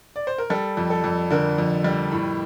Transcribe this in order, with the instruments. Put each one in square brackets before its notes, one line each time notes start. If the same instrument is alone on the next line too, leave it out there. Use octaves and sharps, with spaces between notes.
[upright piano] D5
C5
A#4
G3 A4
F2
A4
F2
D3 A#4
F2
G3
A2